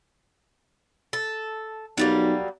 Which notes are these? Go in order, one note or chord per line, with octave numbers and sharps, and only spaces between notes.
A4
B1 F#3 G3 A#3